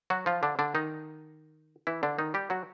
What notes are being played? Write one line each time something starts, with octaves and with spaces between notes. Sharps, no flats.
F#3 F#4
F3 F4
D3 D4
D3 D4
D#3 D#4
E3 E4
D3 D4
D#3 D#4
G3 G4
F#3 F#4